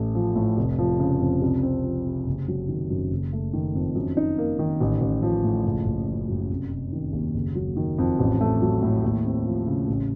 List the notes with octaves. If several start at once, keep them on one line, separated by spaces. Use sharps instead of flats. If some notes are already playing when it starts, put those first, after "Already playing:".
Already playing: A1 A3
F3
A2
F1
F3
C#3
F2
C2
C4
F3
C3
F#1
F#3
D#3
F#2
F#1
A3
D#3
F2
F#2
D#4
A#3
D#3
A1
A1
F3
A2
F#1
F#1
F3
F#2
F1
F1
D#3
D#2
F#1
F#3
D#3
F2
A1
A3
F#3
A2
D#2
C4
F3
C#3
A1